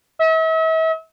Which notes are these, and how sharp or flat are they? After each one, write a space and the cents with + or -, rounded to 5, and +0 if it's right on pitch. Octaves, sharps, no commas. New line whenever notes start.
E5 -40